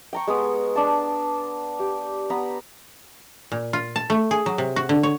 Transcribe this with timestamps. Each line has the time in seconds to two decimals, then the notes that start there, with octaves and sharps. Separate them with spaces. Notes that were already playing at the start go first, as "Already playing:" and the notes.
0.13 G5 A#5 C#6
0.27 G#3 B3 D#6
0.75 D4 A5
1.80 G4
2.30 B3 B4 A#5
3.52 A#2
3.73 F4
3.96 A5
4.10 A3
4.31 G#4
4.46 F#3
4.58 C3
4.76 F#4
4.89 D3
5.03 C#5